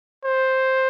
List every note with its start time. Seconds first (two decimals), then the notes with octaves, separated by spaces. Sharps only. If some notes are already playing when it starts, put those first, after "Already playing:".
0.25 C5